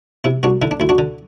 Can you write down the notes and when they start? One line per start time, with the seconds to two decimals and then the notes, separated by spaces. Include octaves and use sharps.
0.24 C3 E4
0.43 C2 D4 F#4
0.62 D3 E4
0.71 D4
0.80 D2 E4
0.89 D4 F#4
0.98 D3